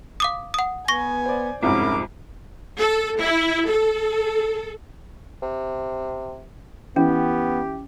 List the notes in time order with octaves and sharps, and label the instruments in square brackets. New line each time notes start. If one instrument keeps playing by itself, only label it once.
[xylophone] F5 D6 D#6
F#5 D#6
[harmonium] B3 [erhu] G#5 [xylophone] C#6 A#6
[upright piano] C5 D5
[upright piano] C2 F2 G#2 [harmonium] C#4 E4 A#4 [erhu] D6
[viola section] A4
E4
A4
[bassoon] C3
[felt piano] E3 [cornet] B3 [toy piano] C#4 [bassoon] G4